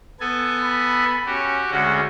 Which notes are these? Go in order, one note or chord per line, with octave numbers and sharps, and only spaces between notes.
B3 A4 G#5
B5
C#4 F#4 G4
D2 G#3 C#4 F#4